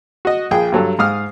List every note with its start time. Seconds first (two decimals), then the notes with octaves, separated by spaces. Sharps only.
0.25 F#4 D#5
0.51 A#1 G#4 G5
0.72 G2 F#3 A4
0.99 G#2 F5 D#6 F6